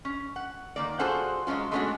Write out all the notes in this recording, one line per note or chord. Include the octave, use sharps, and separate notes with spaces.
C#4
F#5
D#3 A#3 D5
F4 F#4 G#4 A4 C5 F#5
F#3 G#3 A#3 C#4 F4
G#3 A3 B3 C#4 D4 F#4